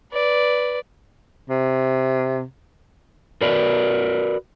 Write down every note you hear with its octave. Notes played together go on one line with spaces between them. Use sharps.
B4 D5
C3
F#4 A#4 B4 D5